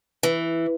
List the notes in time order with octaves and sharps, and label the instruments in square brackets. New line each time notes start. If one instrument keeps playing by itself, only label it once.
[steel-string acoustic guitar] E3